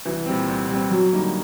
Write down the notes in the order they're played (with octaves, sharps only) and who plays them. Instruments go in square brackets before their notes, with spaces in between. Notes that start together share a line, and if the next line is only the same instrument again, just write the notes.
[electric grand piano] C2 [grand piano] E3
[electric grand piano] A#2 G3 C4
C2
A#2 G3 C4
[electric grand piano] F#2 [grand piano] F#3
[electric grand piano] D3 G3 A#3 D#4